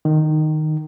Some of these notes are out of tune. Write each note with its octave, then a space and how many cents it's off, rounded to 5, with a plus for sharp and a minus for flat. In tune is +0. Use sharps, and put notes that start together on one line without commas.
D#3 -10